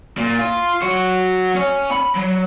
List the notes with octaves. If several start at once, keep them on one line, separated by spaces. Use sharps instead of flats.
A#2
F4
F#3 F#4
C#4 C#5
B5
F#3